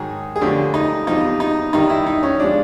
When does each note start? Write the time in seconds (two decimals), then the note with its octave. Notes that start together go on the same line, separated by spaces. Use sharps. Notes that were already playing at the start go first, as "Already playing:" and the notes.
Already playing: G#2 D#3 F#3 G#4
0.36 G#4
0.41 F#2 D3 F3 A3 G4
0.74 D#4
1.07 E2 C3 F3 D#4
1.40 D#4
1.73 G2 D#3 G3 D#4
1.89 E4
2.07 D#4
2.23 C#4
2.40 F3 G#3 D4